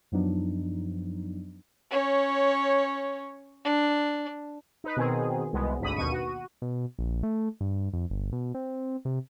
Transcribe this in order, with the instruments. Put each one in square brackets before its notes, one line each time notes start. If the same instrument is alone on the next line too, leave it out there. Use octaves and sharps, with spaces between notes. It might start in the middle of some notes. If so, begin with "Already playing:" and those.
[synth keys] F#2 F3 F#3 B3 D4 D#4
[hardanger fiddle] C#4 C#5
D4
[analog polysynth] D#4 B4
B2 D#3 C4 G#4
C2 B2 G#3 B3
G#1 D2 D3 B5 D#6
D#2 B2 C#6 D#7
F#4
[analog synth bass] B2
A#1
A3
G2
F2
G1
B2
C4
C3